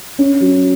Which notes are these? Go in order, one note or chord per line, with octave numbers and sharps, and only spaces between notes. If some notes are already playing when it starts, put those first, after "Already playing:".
C#4
F#3